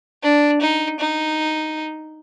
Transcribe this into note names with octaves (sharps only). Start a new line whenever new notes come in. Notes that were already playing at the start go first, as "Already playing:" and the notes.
D4
D#4
D#4